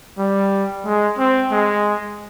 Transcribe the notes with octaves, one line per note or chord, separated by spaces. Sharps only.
G3
G#3
C4
G#3